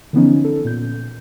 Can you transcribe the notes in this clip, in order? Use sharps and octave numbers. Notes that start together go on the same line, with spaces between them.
D3 E3 F3 B3 C#4 D#4
A4
A#2 G6